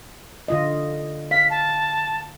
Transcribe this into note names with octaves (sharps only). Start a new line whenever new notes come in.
D3 F4 D#5
F5 B6
A5